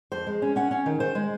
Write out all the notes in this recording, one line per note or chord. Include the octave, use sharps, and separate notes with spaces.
F2 C5
G#3
C#4
C#4 F#5
C#4
D#3
D#3 C5
G#3